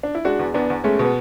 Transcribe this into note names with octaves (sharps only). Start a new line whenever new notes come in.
D4
E4
G#3 D4 F#4
E2
E2 B3 D4
E2
G#3 A3 C#4
B2
B3